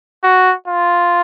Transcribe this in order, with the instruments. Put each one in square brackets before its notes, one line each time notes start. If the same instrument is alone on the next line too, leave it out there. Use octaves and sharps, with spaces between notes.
[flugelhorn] F#4
F4